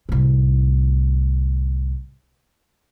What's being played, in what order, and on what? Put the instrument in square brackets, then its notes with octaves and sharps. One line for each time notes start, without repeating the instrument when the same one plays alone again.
[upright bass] C2 A2